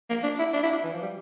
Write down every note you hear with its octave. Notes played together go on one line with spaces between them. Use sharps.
A#3
D4
E4
D4
E4
D4
E3
F3
G3